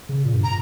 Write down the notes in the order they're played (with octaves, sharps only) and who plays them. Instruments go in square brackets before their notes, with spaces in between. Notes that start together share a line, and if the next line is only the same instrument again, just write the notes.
[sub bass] C#3
A#2
G2
[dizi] A#5